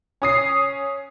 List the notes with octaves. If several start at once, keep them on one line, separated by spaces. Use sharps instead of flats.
C#4 D#6 C7